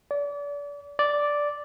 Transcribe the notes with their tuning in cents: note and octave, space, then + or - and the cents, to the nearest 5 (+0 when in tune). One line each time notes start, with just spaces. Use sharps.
D5 -35
D5 -5